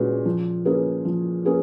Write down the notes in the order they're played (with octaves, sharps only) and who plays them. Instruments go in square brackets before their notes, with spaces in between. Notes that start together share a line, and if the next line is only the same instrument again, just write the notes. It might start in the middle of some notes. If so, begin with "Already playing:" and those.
Already playing: [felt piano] A#2 G#3 C#4 F#4 B4
F3
A#3 C#4 G#4 B4
F3
A#3 C#4 G#4 B4